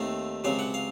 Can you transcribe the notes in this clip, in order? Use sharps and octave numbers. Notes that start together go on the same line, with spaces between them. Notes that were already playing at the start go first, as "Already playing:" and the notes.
Already playing: D#2 D#3 A3 C4 F5
C#2 C3 F#3 F5
F#5
F5